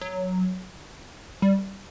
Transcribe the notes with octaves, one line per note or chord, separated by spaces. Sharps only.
F#3
G3